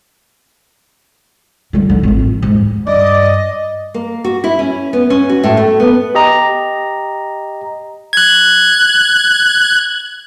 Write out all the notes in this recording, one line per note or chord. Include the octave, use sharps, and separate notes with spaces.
D3 G3
D3 E3
G#1 F2
E3
D#2 G#2
G2 D5 D#5
A#3
F#4
E4
C#4
B3
C#4
F#4
A2
A3
B3
G4 D#5 A#5
F#6 G#6